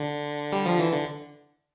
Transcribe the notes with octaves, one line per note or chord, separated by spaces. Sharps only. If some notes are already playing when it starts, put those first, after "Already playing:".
Already playing: D3
G3
F3
E3
D3